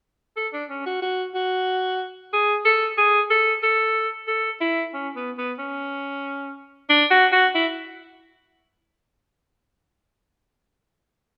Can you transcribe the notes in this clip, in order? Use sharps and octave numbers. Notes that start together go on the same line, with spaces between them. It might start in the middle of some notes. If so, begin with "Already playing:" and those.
A4
D4
C#4
F#4
F#4
F#4
G#4
A4
G#4
A4
A4
A4
E4
C#4
B3
B3
C#4
D4
F#4
F#4
E4